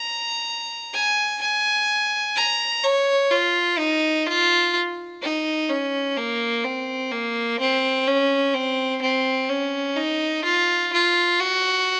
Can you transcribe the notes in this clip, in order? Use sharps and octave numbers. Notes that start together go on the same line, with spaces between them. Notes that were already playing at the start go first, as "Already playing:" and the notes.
Already playing: A#5
G#5
G#5
A#5
C#5
F4
D#4
F4
D#4
C#4
A#3
C4
A#3
C4
C#4
C4
C4
C#4
D#4
F4
F4
F#4